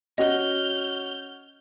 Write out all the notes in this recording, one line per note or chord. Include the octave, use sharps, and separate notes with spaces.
C#4 F#4 D#5 F6 G6